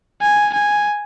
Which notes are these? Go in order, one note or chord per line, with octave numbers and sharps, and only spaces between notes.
G#5
G#5